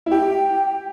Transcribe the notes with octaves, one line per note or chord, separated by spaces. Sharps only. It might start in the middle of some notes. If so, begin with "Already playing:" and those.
E4
G4 G5